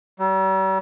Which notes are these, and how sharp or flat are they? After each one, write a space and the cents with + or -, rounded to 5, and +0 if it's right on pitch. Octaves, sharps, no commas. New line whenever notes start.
G3 -45